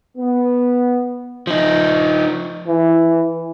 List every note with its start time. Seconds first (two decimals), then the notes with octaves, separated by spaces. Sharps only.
0.17 B3
1.47 F3 D#4
2.67 E3